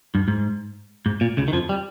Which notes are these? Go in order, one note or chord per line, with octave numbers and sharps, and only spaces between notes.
G2
G#2
G#2
A#2
C#2 C#3
D#3
F2 F3
G3